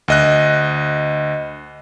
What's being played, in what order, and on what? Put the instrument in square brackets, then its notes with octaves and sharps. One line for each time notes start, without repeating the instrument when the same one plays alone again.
[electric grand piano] D2 D#5 F#6